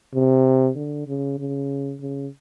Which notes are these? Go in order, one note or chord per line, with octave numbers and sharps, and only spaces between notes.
C3
D3
C#3
C#3
C#3